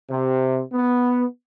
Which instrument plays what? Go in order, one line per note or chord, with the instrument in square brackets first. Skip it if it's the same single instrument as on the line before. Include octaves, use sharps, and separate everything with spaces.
[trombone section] C3
B3